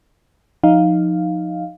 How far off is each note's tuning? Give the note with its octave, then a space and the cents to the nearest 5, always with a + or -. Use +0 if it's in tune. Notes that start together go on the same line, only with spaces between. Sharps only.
F3 +15 D#4 +0 F5 +0